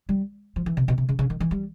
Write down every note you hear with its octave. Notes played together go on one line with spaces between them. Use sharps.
G3
F3
E3
C3
B2
C3
C#3
C#3
D#3
E3
G3